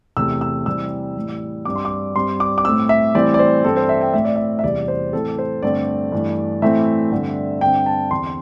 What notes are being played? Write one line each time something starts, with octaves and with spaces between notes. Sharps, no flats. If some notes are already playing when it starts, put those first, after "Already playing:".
E2 C3 A3 E6
E6
C3 E3 G3 C4 E6
A2 E3 G3
G2 G3 C4 D6
C6
D6
G2 G3 C4 C6
D6
D6
A2 A3 C4 E6
E5
A2 E3 G3 C4 D5
D5
C5
G2 E3 C4 A4
C5
E5
G5
A2 A3 C4 E5
D5
E5
E5
E2 C3 E3 G3 D5
C5
A2 E3 C4 A4
C5
G2 D3 A3 C4 D5
G2 E3 A3
A2 E3 A3 C4 E5
G2 D3 C4
G2 D3 C4 G5
A5
E2 D3 C4 C6